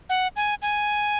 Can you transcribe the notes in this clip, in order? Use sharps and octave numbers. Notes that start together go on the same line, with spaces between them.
F#5
G#5
G#5